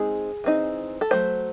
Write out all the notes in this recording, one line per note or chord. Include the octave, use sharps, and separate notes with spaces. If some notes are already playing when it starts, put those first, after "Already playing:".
Already playing: G#3 C4 D#4 G#4
E3 C4 D#4
A4
F#3 A3 C5